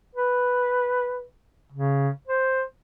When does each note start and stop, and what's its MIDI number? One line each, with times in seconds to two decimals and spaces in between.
0.15 1.23 71
1.72 2.09 49
2.28 2.62 72